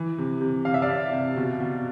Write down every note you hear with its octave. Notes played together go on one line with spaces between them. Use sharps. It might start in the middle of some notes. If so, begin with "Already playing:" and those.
Already playing: E3
C3
C3
C3 F5
E5
D5 F5
C3
C3
B2
B2